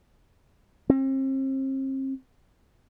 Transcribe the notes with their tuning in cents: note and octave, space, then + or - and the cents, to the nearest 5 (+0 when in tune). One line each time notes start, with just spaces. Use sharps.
C4 +40